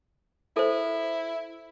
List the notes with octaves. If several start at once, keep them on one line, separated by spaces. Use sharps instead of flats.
E4 A4 C5